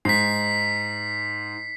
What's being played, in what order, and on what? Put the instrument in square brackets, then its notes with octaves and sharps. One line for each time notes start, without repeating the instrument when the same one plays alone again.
[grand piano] G#2 [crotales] B6 C7